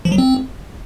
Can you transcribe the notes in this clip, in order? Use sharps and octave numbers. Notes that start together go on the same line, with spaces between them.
F3
F#3
C4